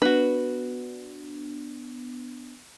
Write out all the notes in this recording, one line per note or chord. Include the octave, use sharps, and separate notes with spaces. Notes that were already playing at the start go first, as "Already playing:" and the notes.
B3 D4 F#4 B4